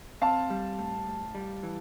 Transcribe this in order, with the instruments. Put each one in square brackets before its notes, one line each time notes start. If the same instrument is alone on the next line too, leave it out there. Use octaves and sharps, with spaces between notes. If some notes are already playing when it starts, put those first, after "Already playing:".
[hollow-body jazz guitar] C4 [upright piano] F5 A5
[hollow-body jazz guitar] G3
A2
A2
G3
E3